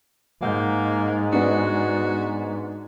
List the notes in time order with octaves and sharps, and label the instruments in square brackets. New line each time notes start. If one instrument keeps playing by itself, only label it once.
[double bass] G#2 [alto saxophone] A#3 [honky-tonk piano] F#5 G6
[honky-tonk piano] B3 D4 [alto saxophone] F#4